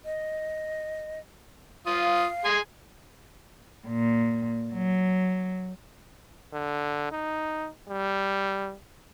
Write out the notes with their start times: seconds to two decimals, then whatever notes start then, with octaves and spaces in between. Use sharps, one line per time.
0.05 D#5
1.86 F4 F5 D#6
2.45 G#4 G#5 C6
3.86 A#2
4.73 F#3
6.53 D3
7.12 D#4
7.89 G3